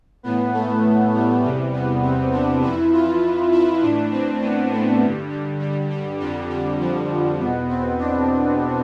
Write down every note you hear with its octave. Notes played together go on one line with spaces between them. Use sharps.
A2 E3 B3
A3
G3
E2 C3 E3 G3
B3
C4
D4
F2 E3 E4
F4
E4
A2 E3 D4
C4
B3
A3
G2 D3 G3
G3
G3
G3
F2 D3 G3
G3
F3
E2 B2 B3
C4
D4